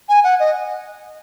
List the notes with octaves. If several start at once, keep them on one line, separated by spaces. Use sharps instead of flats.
G#5
F#5
D#5